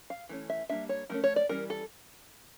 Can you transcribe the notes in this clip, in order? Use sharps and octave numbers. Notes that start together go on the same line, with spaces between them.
F5
E3 A3 C#4
E5
G3 A#3 D4 E5
C#5
F3 A3 C#4 A#4
C#5
D5
E3 G3 C#4 A#4
A4